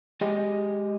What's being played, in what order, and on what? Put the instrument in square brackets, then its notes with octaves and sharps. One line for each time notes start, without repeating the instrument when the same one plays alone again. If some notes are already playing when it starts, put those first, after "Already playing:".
[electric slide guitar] G#3 G4 G#4 D#5 G5 G#5